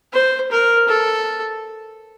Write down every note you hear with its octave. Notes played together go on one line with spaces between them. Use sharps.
C5
A#4
A4